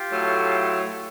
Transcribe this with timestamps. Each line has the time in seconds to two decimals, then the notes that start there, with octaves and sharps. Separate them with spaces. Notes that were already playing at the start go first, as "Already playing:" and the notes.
Already playing: F4 G4
0.10 A2 F#3 A3